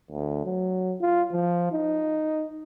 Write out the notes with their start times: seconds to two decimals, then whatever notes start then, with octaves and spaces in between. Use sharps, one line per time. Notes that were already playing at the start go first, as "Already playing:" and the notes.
0.11 D2
0.45 F#3
1.01 F4
1.32 F3
1.73 D#4